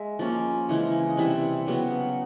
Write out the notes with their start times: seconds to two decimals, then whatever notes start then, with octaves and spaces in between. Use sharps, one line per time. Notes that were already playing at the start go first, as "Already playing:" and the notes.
Already playing: G#3 E5
0.19 F3 A#3 C#4
0.69 C#3 E3 G#3 C#4
1.10 D#5
1.17 C3 E3 G3 E5
1.67 C#3 F#3 B3